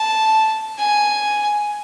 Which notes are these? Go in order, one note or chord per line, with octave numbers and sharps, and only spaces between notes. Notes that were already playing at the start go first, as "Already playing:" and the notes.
Already playing: A5
G#5